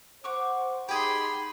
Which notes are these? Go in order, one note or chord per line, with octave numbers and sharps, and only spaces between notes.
C5 F#5 C#6 D6
D#4 G4 G#4 B5 C6